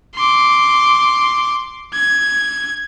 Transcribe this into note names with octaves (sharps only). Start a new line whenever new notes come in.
C6 D6
G#6